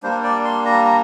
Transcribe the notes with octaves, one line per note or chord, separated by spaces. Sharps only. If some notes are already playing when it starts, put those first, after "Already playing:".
G3 A#3 D4 C5
D5
C6
A#5
A#5